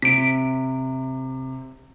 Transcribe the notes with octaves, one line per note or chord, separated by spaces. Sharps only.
C3 B6 D7